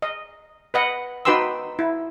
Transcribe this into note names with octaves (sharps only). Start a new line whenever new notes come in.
D#5
B4 D#5 F#5
D#4 F#4 B4 G5 C6 E6
E4